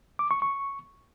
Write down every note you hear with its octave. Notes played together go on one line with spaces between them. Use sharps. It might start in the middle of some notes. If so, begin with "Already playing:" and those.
D6
C#6
C#6